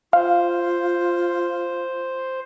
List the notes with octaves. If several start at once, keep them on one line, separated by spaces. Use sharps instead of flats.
F4 C5 F5